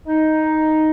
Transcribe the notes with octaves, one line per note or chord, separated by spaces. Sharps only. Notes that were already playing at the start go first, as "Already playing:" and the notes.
D#4